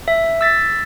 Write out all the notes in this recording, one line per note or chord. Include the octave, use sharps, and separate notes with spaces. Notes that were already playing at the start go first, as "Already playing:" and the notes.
E5
E6 A6 B6